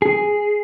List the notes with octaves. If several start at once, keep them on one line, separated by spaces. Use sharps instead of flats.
G#4